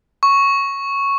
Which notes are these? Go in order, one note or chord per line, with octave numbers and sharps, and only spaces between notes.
C#6